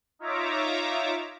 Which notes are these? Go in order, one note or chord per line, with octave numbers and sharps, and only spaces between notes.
D#4 F4 C#5 E5 A#5 D6